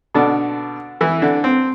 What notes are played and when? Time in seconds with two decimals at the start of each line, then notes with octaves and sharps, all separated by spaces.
0.14 B2 D3 D4
1.01 E3 E4
1.22 D3 D4
1.44 C4